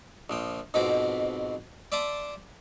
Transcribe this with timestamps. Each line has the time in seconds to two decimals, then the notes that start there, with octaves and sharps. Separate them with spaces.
0.30 A#1 F3 G5
0.74 F2 G#2 B2 C4 B5 D6
1.92 D5 E5 A5 C6 D6 D#6